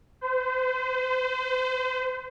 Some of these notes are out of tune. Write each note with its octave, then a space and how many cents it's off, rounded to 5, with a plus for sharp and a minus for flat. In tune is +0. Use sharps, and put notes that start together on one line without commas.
C5 -35